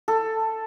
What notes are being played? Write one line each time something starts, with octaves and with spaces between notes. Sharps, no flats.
A4